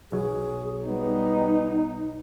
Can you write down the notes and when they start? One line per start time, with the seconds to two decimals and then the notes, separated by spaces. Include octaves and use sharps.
0.12 B1 F#3 G#4
0.87 G3 B3 D#4